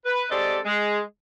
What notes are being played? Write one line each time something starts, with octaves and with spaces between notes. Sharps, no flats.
B4
G#3 C4 G4 A4 D5 D#5
G#3